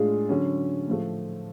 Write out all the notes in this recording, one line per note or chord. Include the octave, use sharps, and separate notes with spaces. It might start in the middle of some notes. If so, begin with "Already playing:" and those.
Already playing: A2 G#3 D4 F4 G#4
D3 F#3 C#4
A2 F3 A3